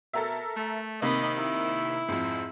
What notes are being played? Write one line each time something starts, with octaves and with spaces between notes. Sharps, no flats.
B2 A4 A#4 E5
A3
C3 D#3 A#3 D#5 B5
E4
F2 G#2